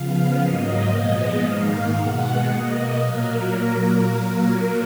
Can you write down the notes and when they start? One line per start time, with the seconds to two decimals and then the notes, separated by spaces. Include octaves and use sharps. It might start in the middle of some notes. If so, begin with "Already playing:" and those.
Already playing: C#3 F3 B3 F5
0.41 G#2 F#3 A#3 D#5
0.93 A#2 F3 G#3 B3
1.44 G#2 D#3 A#3 F5
1.95 B2 G#3 B3 F#5
2.47 B2 A#3 D#5
2.99 A#2 F#3 A#3 A#4